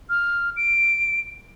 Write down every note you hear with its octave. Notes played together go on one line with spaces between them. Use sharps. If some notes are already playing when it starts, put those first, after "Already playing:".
F6
D7